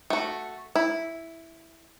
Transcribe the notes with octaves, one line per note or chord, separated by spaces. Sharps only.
A3 F#4
E4